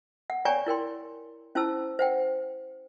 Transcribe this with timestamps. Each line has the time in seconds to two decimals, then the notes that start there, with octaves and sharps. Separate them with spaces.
0.30 F#5
0.45 C#5 D5 G5 G#5 A#5 C#6
0.67 E4 A#4 G5 C6
1.55 C#4 E4 C5 A5 E6
1.99 C5 F#5 G5